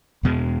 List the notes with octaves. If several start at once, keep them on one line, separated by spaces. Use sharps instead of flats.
E2 B2 G#3